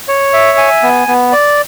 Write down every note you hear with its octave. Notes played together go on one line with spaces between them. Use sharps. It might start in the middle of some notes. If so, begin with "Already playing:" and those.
C#5
E5
G#5
B3
B3
D5